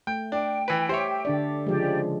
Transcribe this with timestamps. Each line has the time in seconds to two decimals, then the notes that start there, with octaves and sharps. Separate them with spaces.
0.07 A3 G5
0.32 D4 G5
0.68 E3 B4
0.89 G4 C5 C#5 E5
1.25 D3 D4 D5
1.66 C#3 F3 G#3 G4 D5